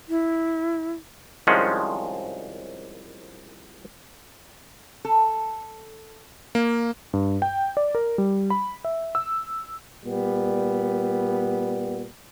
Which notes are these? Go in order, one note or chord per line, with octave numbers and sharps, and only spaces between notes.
E4
C2 D#3 F3 G#3 C#4 F#5
A4
A#3
G2
G5
D5
A#4
G3
B5
E5
E6
A#2 G3 B3